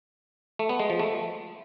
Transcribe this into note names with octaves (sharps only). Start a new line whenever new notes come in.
A3
B3
G#3
F3
A3